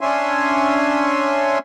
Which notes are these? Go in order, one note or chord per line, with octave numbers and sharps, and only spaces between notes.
C#4 D4 C#5 E5 G#5 C6